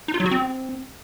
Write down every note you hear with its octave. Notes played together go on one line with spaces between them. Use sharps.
D#4
F4
F#3
F#4
C4